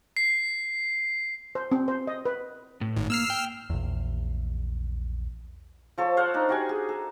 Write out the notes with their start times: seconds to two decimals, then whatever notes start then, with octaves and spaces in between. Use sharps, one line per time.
0.17 C7
1.55 C5
1.72 C4
1.88 C5
2.07 D#5
2.26 B4
2.81 A2
2.96 G#1
3.10 A#3 E6 F6 C7
3.30 G5
3.70 A#1 E2
5.98 F3 A4 C#5
6.17 C5 C#5 F5 F#5
6.34 D4 D#4
6.49 F#4 G4 G#5
6.69 G#4
6.89 A4